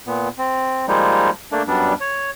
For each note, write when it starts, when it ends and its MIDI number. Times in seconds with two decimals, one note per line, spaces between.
0.07 0.29 46
0.07 0.29 59
0.38 0.86 60
0.88 1.30 53
0.88 1.30 55
0.88 1.30 56
0.88 1.30 58
0.88 1.30 63
1.52 1.63 57
1.52 1.63 58
1.52 1.63 62
1.67 1.94 42
1.67 1.94 55
1.67 1.94 59
1.67 1.94 62
2.01 2.30 73